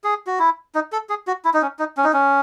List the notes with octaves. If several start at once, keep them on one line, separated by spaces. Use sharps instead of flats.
G#4
F#4
E4
D#4
A4
G#4
F#4
E4
D#4
C#4
D#4
C#4
D#4
C#4